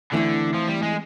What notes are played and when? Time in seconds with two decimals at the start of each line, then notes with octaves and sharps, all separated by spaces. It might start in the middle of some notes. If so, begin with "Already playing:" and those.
0.12 D3 E3 A3 C4 E4
0.54 F3
0.68 G3
0.83 G#3